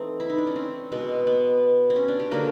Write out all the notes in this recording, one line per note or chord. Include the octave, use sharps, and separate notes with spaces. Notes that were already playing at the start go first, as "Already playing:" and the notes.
Already playing: E3 A3 C4 D#4
E4
D#4
D4
C#4
C4
B2 G#3 B3
B3
C4
C#4
D4
G4
D3 F#3 A#3 F#4